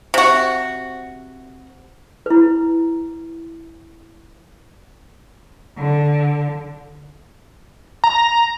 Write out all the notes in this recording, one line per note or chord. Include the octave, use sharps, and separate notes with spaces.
C3 F#4
E4 B4
D3
A#5